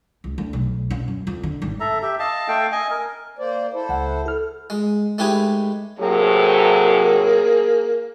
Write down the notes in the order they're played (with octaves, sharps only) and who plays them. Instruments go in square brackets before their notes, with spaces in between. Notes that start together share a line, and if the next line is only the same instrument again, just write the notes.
[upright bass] C#2
D2
B1
C#4
F#2
F2
D3
G#1
[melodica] A4 E5 A#5
G4 E5
D#5 F5 A5
A3 A4 F5 G5
D#5 G#5
A#4
[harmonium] A#3 C5 D5
E4 A4 C5
[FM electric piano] C#2 F#5
A4 F6
[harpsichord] G#3
G#3 A3 D#4 G4 B4 G#5
[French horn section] A2 C3 F#3 [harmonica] A#3 G#4